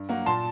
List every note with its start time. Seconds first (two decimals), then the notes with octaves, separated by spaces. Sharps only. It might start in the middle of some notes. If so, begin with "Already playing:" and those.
Already playing: G2
0.09 F#3 A#3 F#4
0.26 A#2 A5 C6